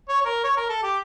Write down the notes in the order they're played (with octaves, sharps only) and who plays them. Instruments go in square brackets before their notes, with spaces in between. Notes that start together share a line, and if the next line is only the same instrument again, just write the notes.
[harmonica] C#5
C#5
A#4
C#5
A#4
A4
G4